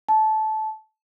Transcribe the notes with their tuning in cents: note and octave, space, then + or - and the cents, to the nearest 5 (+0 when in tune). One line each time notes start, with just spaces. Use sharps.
A5 -20